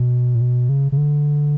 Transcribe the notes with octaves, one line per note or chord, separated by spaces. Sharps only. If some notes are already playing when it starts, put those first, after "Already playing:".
Already playing: B2
A#2
B2
C#3
C#3
D3